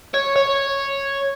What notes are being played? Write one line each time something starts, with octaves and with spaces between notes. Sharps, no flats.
C#5
C#5